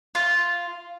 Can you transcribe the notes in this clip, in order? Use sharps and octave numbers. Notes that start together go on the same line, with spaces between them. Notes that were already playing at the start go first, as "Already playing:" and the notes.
F4